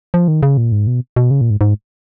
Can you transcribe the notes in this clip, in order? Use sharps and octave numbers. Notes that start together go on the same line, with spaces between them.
F3
D#3
C#3
A#2
G#2
B2
B2
C#3
A#2
G#2
G#2